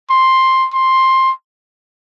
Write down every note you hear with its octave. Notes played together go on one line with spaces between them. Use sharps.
C6
C6